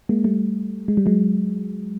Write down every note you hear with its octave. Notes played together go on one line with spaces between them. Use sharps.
G#3 A#3
G3 A3
G#3
G3
F#3 G#3